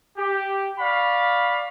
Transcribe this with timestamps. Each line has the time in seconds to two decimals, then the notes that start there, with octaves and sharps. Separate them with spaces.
0.17 G4
0.79 D5 F5 B5 C#6